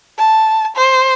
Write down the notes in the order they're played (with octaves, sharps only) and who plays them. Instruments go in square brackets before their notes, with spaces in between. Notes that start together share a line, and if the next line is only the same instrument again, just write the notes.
[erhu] A5
C5